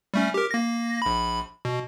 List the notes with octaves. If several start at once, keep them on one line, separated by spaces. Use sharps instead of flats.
G3 A3 C#4
G4 A#4
A#3 A#6
A#1 B5
B2